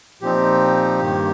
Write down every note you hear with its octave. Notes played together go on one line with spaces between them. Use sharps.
A#2 F3 C4 D#4 G4
G2 D#3 A#3